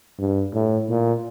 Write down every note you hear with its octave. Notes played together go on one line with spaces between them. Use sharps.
G2
A2
A#2